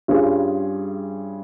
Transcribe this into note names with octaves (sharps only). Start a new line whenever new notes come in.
G2 G3 C#4 F4 G#4